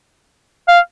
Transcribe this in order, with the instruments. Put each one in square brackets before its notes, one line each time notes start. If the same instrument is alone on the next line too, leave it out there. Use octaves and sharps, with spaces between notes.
[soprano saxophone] F5